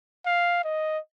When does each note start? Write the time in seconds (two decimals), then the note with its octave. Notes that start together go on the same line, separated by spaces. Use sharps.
0.26 F5
0.64 D#5